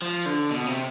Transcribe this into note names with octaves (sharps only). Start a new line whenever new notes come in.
F3
D3
B2
C3